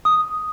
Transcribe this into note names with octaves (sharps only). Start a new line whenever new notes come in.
D#6